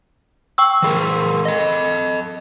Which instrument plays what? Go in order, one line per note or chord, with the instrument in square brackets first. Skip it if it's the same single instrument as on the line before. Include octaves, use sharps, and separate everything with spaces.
[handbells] G5 C#6 E6
[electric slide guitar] E3 G#4 A#4
A4 D#5